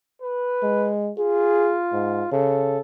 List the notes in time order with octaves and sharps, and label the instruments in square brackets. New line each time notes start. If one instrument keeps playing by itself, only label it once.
[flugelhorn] B4
[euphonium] G#3
[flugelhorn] F4 [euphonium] G#4
[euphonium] G#2
[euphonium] C#3 [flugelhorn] A4